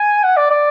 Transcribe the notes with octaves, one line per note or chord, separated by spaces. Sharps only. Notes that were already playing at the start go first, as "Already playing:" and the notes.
Already playing: G#5
F#5
D5
D5